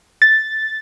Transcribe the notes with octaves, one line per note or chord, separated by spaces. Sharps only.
A6